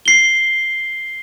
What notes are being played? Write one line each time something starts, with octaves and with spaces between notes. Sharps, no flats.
C7 G7